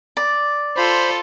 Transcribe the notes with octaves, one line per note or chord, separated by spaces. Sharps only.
D5
F4 A4 C5 B5